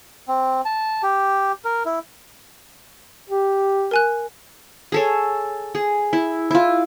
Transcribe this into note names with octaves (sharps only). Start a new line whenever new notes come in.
C4
A5
G4
A#4
E4
G4
A#4 G#5 F#6
G#4 A4 C#5
G#4
E4
E4 F4